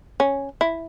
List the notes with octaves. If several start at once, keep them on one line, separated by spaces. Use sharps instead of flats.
C#4
E4